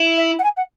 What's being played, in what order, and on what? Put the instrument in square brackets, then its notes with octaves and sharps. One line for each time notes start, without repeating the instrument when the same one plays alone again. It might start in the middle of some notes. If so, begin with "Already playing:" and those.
Already playing: [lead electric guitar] E4
[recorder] E5
F#5
G#5
F#5